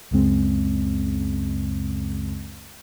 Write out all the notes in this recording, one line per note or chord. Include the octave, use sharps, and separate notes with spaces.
C#2 F#2 C#3 G#3 C4